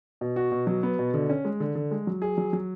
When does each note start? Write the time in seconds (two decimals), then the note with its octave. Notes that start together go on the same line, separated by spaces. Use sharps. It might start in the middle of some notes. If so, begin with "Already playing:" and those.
0.21 B2
0.36 F#4
0.52 B2
0.67 F#3
0.83 B3
0.99 B2
1.14 D3
1.29 C#4
1.45 G#3
1.60 D3
1.75 D3
1.91 G#3
2.07 F#3
2.22 G#4
2.38 F#3
2.53 F#3